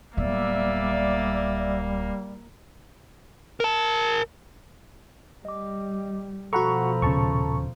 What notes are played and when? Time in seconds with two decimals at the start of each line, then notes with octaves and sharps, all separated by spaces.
0.17 D1 G3 A#3 B3 D5 E5
3.60 A#4 A5
5.45 G3 D#5 D6
6.53 B2 F3 F#4 A4 F#5 A#5 B5 C#6
7.02 D#1 C#3 A5 C#6